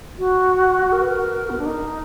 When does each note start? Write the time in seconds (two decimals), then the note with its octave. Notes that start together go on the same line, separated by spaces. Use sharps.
0.19 F#4
0.92 A#4
1.01 B4
1.09 A#4
1.50 B3
1.58 D4
1.66 D#4